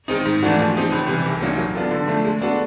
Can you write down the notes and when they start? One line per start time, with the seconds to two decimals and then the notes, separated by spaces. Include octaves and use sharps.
0.08 D#3 G#3 C4 D#4
0.25 G#2
0.43 E3 A3 D4 F#4
0.59 F3
0.75 G#3 C4 D#4 G4
0.92 C#2
1.08 C3 E3 G3
1.25 C2
1.41 A#2 F#3 A#3 D#4
1.58 F#3
1.75 B3 D4 F4 A4
1.91 D3
2.08 F3 A3 D4
2.24 G#3
2.41 B3 D4 F#4 A4